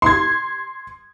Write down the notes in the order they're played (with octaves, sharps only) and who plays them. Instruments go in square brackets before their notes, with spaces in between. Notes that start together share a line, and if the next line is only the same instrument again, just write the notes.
[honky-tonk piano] C6 G#6